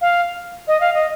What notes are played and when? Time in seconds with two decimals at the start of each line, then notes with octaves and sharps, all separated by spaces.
0.01 F5
0.68 D#5
0.80 F5
0.94 D#5